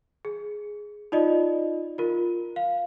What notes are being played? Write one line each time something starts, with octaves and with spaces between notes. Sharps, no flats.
G#4
D#4 F4 D5 D#5
F4 A#4
F5